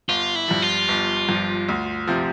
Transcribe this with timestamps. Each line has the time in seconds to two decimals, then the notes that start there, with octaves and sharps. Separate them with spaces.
0.09 G1 F4
0.35 E4
0.48 G2 F3
0.62 F4
0.88 G1
1.29 G2 F3
1.69 D2
2.07 C3 F3